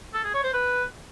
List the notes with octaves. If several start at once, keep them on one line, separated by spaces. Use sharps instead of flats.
A4
G#4
C#5
C5
B4